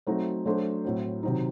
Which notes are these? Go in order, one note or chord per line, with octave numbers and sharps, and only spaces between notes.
F#3 A3 C4 D#4 F#4
F#3 A3 D4 A4 C5
A2 F#3 C4
C3 D#3 F#3 C4 D#4